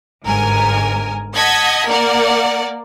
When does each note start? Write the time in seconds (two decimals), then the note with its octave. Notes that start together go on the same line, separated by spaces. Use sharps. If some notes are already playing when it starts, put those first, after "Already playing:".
0.23 G1 G#2 A#4 G#5
1.35 D#5 F#5 A5 G#6 B6
1.88 A#3 A#4 D5 F#5